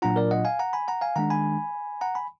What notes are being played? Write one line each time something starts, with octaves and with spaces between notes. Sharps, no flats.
A#2 F#3 D4 F4 F#5 A#5
A#4 D5
D#5 F#5
F5 G#5
F#5 A#5
G#5 B5
F#5 A#5
F5 G#5
D#3 G#3 D4 F#5 A#5
G#5 B5
F#5 A#5
G#5 B5